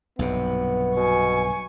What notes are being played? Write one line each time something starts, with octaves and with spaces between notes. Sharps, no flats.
B1 G2 C3 B3
B2 G#5 C#6